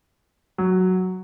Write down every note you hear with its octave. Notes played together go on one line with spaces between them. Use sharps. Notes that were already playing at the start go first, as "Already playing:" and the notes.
F#3